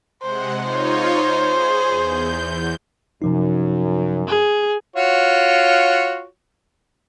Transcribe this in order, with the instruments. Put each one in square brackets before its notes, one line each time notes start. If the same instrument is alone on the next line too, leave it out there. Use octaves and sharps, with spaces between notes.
[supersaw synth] C3 G#3 F#5 [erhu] C5
[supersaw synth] D#4 F4 C#5 [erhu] C5
[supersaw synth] G#4
E2 G6
[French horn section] F#2 [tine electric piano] C3 F3 D#4
[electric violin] G#4
[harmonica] F4 F#4 C#5